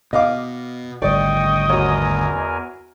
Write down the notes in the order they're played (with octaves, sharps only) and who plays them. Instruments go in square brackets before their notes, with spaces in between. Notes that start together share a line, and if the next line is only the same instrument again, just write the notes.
[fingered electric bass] B2 [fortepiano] D#5 F5 D6
[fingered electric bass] G#1 D2 G3 [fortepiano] D5 [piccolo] D#5 [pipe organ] G5 C#6
[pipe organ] E2 A#4 G#5 [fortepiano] F#4 C#5